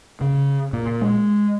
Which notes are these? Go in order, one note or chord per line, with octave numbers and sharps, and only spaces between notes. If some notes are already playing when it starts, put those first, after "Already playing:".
C#3
A#2
G#3